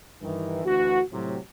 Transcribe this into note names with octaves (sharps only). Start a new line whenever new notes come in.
G2 D#3 E3
D2 E3 F#4
A2 C3 F#3